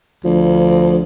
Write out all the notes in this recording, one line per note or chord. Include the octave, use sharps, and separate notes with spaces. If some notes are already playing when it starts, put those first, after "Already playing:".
D2 F3